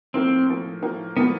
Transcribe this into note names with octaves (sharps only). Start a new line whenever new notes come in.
A2 F3 A#3 C4
A2 F3 A#3
A2 F3 A#3
A2 F3 A#3 B3